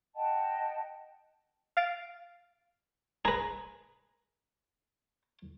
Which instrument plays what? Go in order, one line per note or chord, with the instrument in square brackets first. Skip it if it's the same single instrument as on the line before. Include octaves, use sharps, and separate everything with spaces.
[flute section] D#5 F#5 G5 A5
[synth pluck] F5 A6 D7
[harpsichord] G#4 B4 [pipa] A#5